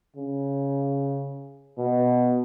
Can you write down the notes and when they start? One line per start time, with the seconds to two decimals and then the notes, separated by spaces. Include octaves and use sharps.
0.16 C#3
1.79 B2